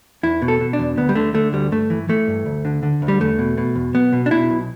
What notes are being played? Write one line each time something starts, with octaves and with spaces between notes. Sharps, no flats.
E2 E4
B2
A4
B2
D4
E2
D2 B3
G3
D3 A3
D3 A3
D2 G3
G2 A3
E3
E3 A3
G2
D2
D3
D3
D2
G3
E2 A3
B2
B2
E2
B1 B3
B2
D4
B2 E4
B1